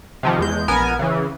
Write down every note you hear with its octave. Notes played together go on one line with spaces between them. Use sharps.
C3 D#3 F3
E2 G#3 G6
A#1 B3 A#4 G#5
C#3 E3